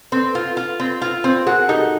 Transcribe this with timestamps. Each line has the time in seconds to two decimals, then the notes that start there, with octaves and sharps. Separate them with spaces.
0.12 C4 A4 B4
0.35 F4
0.57 F4
0.80 C4
1.02 F4
1.24 C4
1.46 F#4 G#4 A#4
1.69 D#4 G4 A4